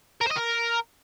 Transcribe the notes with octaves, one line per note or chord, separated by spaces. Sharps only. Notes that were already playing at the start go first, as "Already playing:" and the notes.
A#4
C5
D#5
A#4